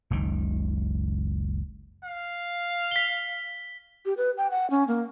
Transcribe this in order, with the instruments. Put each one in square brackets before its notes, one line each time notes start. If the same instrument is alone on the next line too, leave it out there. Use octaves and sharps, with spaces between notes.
[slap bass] F#1 C#2 D#3
[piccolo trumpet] F5
[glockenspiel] B6 G7
[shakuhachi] G4
B4
G5
F#5
C#4
A#3